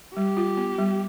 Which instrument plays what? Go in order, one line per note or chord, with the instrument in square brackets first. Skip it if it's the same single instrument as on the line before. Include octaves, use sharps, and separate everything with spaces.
[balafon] G3 [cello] G4
[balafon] F4
B3
G3